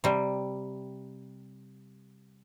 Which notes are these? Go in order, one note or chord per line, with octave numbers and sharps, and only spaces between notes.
C3 G3